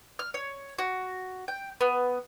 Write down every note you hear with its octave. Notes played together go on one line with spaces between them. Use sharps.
F6
C#5
F#4
G5
B3